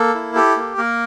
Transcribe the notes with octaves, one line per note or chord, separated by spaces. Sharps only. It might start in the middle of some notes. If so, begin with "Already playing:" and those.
Already playing: A#3 A4
E4
G4 A4
A#3
A#3 A#4